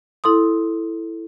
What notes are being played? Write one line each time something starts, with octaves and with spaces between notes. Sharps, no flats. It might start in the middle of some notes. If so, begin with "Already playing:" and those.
E4 A4 C6 D#6